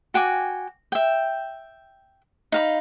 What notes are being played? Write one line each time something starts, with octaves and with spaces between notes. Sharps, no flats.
F#4 G5 G#5 D6
E5 G5
D#4 F5 B5